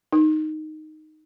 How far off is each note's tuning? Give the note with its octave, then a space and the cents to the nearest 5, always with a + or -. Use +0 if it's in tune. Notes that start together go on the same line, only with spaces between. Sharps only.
D#4 -5